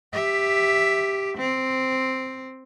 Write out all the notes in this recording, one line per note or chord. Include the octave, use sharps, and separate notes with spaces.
G4 E5
C4